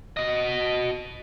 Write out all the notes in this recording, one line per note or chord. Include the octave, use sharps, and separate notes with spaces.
F#4 D#5